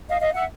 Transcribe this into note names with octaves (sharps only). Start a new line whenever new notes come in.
D#5 F5
D#5 F5
E5 F#5